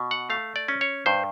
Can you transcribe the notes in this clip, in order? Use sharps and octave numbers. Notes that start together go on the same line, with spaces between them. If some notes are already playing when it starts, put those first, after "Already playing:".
Already playing: B2
F#5
A3 F5
D5
C#4
C#5
G2 C5